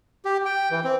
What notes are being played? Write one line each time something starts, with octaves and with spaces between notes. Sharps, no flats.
G4
G5
E3
C4